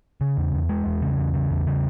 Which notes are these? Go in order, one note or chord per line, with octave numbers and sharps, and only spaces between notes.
C#3
E2
E2
G#3
E2
C#3
E2
C#3
E2
C#3